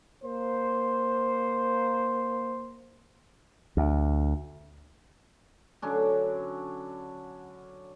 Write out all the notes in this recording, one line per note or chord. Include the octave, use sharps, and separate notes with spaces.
A#3 C5
D2
D3 F#3 C#4 D4